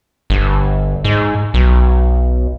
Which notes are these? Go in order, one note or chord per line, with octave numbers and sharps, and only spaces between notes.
G1
G#2
B1